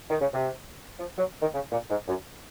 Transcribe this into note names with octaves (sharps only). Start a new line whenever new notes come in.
D#3
C#3
C3
F3
F#3
D#3
C#3
A#2
G#2
F#2